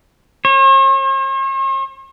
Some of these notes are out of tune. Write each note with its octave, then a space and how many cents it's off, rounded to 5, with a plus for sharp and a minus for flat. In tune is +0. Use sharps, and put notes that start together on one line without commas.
C#5 -45